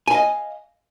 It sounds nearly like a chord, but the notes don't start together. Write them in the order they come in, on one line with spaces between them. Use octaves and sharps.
G#5 F5 D#5